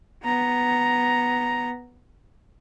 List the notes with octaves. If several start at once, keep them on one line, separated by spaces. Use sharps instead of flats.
B3 A#5